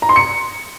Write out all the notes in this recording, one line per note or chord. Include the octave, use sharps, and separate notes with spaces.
A#5
C6
C#7